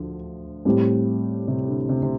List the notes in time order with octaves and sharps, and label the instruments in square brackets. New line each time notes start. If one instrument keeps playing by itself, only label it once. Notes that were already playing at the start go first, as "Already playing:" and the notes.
Already playing: [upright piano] D2 [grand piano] D3 F3
[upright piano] A2 G3 C4 G4
[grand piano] C3
D3
C3
C3